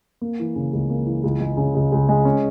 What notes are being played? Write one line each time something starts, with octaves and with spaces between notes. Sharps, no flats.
A#3
E3
C#3
C#2
A#3
E3
C#2
G#3
C#3
C#2
C#2
G#3
C#4